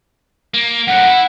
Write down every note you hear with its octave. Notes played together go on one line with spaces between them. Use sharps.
A#3
F#2 A2 F#5
E4